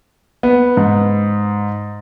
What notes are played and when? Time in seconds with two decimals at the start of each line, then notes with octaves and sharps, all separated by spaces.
0.43 B3
0.77 G#2